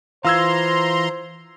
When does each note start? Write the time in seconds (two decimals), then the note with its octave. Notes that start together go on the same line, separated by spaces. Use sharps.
0.25 E3 F4 C5 F5 A#5 C6 E6 G#6